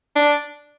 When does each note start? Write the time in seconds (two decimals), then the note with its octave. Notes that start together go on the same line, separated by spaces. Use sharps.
0.16 D4